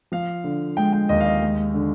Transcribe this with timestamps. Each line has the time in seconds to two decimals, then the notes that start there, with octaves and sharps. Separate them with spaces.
0.12 F3 F5
0.44 D3
0.77 G#3 G5
0.93 G5
1.09 D#2 D#5
1.20 F5
1.26 D#5
1.42 G#3
1.74 D3